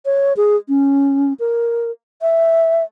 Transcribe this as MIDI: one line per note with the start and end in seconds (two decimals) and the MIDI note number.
0.06 0.33 73
0.37 0.56 68
0.69 1.33 61
1.40 1.91 70
2.22 2.84 76